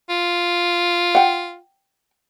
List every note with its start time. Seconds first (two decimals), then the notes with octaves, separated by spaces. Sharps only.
0.10 F4
1.15 F#5 G5